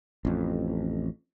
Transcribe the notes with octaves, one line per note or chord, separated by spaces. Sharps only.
A1 F2